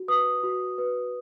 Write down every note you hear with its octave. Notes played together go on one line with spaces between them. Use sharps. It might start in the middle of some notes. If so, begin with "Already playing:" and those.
Already playing: F#4
B4 D#6
F#4
B4